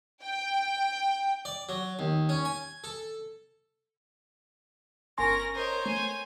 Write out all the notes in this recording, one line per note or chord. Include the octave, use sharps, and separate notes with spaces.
G5
D5
F#3
D#2
C#4
G#5
A4
G1 C#4 A#4 G#5 C6 A#6
A#4 C5 C#5 D#5
A3 G#5